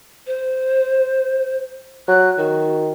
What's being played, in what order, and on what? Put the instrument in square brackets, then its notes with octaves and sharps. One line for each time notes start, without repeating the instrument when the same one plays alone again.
[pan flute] C5
[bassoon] F#3 [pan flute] F#6
[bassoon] D#3 [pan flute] F#4